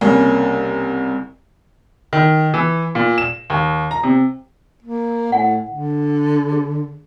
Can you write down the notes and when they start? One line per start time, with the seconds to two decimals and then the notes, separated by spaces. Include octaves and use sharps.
0.01 C2 C#3 A#3
2.13 D#3
2.54 E3
2.95 A#2
3.18 E7
3.50 D#2
3.91 A#5
4.04 C3
4.83 A#3
5.32 A2 F#5 G#5
5.71 D3
6.52 G#4